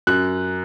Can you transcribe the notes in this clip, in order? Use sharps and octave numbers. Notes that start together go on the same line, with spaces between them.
F#2 F#6